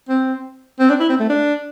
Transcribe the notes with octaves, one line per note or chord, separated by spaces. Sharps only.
C4
C4
D4
E4
C4
A3
D4